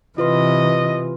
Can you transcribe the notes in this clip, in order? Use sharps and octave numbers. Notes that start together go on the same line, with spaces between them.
C3 E3 F4 B4 D#5 C6